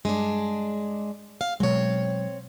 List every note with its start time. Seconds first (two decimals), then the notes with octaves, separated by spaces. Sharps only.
0.05 G2 G#3 D4
1.41 F5
1.60 B2 F#3 G#3 C4 C#5